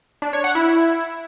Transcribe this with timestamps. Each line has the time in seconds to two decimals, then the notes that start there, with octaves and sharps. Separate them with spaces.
0.22 D4
0.33 C#5
0.44 F#5
0.55 E4